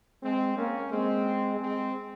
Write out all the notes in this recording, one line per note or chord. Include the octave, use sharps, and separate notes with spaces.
G#3 C4
A#3 C#4
G#3 C4
G#3 C4